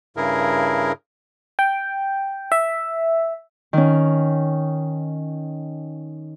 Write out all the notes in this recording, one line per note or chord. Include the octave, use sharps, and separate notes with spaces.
G2 C#3 E4 G#4 A#4
G5
E5
D#3 C#4